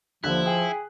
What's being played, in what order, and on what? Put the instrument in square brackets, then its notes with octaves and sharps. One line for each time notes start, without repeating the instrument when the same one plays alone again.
[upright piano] D#2 D3 F#6 [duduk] F3 [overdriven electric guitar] E4
[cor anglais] G#4 [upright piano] G5